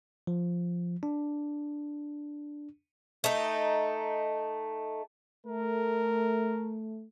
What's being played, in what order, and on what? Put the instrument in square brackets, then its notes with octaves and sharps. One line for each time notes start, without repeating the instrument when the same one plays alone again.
[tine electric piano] F3
D4
[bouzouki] A3 D#4
[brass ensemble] A3 [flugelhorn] A#4